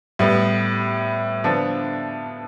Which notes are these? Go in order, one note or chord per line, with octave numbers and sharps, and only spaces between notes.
A2 G3 B3
D3 F3 B3 D4